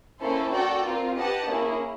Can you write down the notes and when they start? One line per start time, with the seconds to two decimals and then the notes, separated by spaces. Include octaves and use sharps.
0.21 A#3 C#4 E4 A4 C5
0.53 F#4 A4 D5 G5
0.85 C4 F4 A#4
1.16 G4 B4 D#5 F#5 A5
1.48 A#3 C#4 E4 G#4